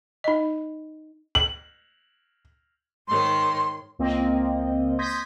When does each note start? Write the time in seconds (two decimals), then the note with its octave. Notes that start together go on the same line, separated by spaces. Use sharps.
0.24 D#4 D#5
1.35 F#7
3.07 G#2 D#3 C#5 C6
3.99 C#2 A#3 C4 D#5
4.99 C6 D#6 G6 G#6 A#6 B6